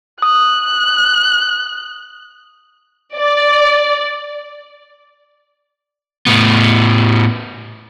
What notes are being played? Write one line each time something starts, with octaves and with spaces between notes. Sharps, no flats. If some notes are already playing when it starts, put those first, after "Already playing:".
D#6 F#6
D5
A2 B3